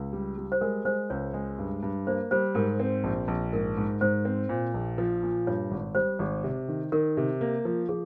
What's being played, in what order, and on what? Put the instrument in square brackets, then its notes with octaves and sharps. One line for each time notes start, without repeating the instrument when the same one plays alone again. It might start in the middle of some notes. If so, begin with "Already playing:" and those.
Already playing: [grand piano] C#2
G3
G3
[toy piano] C5
[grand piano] G#3 [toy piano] A#4
[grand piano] G#3 [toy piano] C5
[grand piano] C#2 [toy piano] C#5
[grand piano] G#3
G2
G2
[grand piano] A#3 [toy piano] C5
[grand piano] G3 [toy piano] C5
[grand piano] G#2 [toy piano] A#4
[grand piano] C4
A#1
A#1
[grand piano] G#2 [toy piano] A#4
[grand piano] G#2
[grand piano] G#2 [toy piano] C5
[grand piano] C4
A#2
A#1
F3
A#2
[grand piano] G2 [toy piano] C#5
[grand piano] G#1
[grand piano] G3 [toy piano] C5
[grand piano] G#1
C3
D#3
[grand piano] D#3 [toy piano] A#4
[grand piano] C3
A#3
F3
[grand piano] F3 [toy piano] G#4